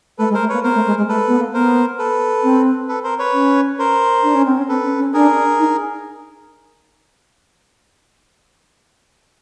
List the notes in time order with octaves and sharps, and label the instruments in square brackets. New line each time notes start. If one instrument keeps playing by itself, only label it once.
[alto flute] A3 [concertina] A4 B4
[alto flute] G#3
[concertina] A#4 C5
[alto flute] A3
[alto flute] A#3 [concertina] B4 C#5
[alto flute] B3 [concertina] A#4 C5
[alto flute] A3
G#3
G#3
[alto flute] A3 [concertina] A4 B4
[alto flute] B3
A#3
[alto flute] B3 [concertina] A#4 C5
[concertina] A4 B4
[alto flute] C4
[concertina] A4 B4
A#4 C5
B4 C#5
[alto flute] C#4
[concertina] A#4 C5
[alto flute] D4
C#4
C4
C#4
[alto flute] C4 [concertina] A4 B4
[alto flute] C#4
C#4
[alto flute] D4 [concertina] G#4 A#4
[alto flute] D#4